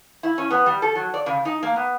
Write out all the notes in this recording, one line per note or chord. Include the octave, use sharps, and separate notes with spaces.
E4
C#4
B3
G3
A4
F#3
D5
C#3
D#4
A#3
B3